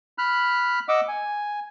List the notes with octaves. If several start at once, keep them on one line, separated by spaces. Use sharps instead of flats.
B5 F6 F#6
D#5 F#5 D6 E6
G#5